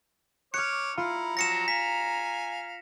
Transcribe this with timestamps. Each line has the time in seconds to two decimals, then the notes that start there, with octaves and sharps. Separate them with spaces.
0.54 C#5 D6 F6 F#6 C#7
0.97 E4 F4 A#5
1.37 F3 F#3 A#6 C#7 E7
1.68 F5 G#5 B6